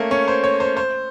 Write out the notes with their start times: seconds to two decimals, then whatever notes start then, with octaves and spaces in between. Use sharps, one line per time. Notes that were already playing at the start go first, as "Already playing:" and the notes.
Already playing: A3 A#3 C#4
0.11 C#4
0.28 C5
0.44 C#5
0.60 C5
0.77 C5